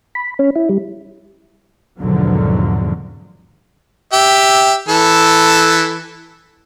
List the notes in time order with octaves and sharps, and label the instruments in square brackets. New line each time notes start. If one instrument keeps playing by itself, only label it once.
[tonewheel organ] B5
C#4
E4
G3
[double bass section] G#1 E2 B2 D3 F3 F#3
[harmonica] G4 E5
E3 A4